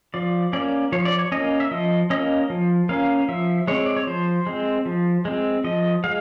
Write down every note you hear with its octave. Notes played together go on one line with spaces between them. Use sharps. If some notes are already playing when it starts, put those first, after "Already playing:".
F3 D5
A#3 C#4 D5
F3 C#5
D5
C#5
A#3 C#4 D#5
E5
F3 D#5
A#3 C#4 D#5
F3
A#3 C#4 F5
F3 E5
G#3 C4 C#5
D5
C#5
F3 C5
G#3 C4
F3
G#3 C4
F3 D#5
G#3 F5